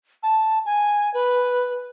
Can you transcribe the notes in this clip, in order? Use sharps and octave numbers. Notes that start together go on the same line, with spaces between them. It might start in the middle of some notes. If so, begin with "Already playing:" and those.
A5
G#5
B4